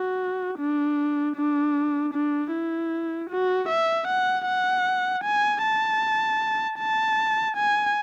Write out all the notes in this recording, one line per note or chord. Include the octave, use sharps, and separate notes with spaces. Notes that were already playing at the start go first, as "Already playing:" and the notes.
Already playing: F#4
D4
D4
D4
E4
F#4
E5
F#5
F#5
G#5
A5
A5
G#5